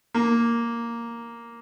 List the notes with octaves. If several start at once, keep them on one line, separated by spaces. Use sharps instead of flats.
A#3